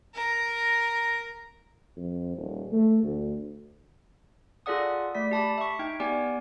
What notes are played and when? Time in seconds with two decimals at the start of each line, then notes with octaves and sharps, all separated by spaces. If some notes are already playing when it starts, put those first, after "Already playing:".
0.14 A#4 A#5
1.97 F2
2.36 D#1
2.72 A3
3.04 D2
4.66 F4 G#4 A4 D5 F#5 D#6
5.15 A3 D5 B6
5.31 G4 A5 B5
5.58 E5 C#6
5.79 D#4 G5
6.00 B3 G4 D5 G5 G#5